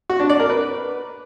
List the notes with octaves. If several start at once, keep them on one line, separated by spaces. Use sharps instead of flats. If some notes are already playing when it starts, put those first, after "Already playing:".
F#4
D4
D5
A#4
B4